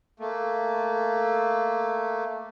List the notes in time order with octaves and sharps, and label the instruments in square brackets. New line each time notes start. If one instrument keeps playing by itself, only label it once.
[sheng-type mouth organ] A3 A#3